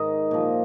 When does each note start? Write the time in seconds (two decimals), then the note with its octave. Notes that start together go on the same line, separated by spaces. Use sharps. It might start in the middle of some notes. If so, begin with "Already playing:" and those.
Already playing: G#2 D#3 D#5
0.31 A#2 F3